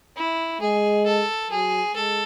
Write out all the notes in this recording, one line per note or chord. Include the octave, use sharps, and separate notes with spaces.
E4
G#3 G#4
A4
F#3 G#4
G#3 A4